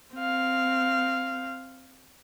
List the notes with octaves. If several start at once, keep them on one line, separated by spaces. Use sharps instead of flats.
C4 F5